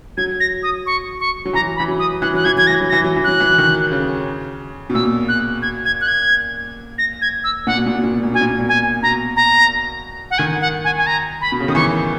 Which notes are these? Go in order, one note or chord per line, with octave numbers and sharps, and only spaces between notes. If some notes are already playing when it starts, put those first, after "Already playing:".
F#3 G#6
A#6
D#6
C#6
C#6
F#3
E3 A#5
B5
E3
F#3
D#6
E3 F#6
F#3 F#6
E3 G#6
F#3 G#6
E3 A#6
F#3
E3 A#6
F#3
E3
F#3 F#6
E3
D#3
C#3
B2
A#2 E6
F#6
G#6
G#6
F#6
G#6
A#6
G#6
E6
A#2 F#5
B2
A#2
B2
A#2
B2
A#2
B2 G#5
A#2
B2
A#2
G#5
B2 A#5
A#5
F#5
D#3 G#5
F#5
G#5
G#5
A#5
B5
B2
C#3
D#3 D#6
E3 C#6